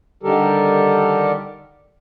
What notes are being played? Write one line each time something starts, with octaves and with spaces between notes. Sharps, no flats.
D3 D#3 G3 G4 A4 A#4